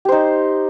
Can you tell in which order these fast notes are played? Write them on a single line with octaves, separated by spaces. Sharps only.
G4 C5 D#4